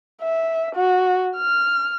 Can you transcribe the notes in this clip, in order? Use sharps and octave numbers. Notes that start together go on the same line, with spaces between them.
E5
F#4
F6